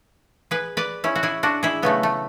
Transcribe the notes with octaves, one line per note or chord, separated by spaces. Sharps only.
G#4 B4
B4 D5
C#4 E4
F#4
E4 G#4
D4 F#4
E4 G#4
C#3 F#3 A3 B3
A3